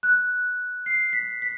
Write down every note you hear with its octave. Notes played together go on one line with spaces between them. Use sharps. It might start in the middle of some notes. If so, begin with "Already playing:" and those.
F#6
C7
B6
B6